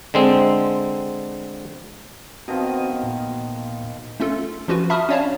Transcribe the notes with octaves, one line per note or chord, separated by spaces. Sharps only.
D3 G#3 C4
B2 D#3 F3 C4 F#4 D#6
A#2
A3 C#4 F4 A4
F3 C#4 F4 F#4 B4
E5 A5 B5 C#6 D#6 F6
C#4 D4 C#5 D5 F5 A5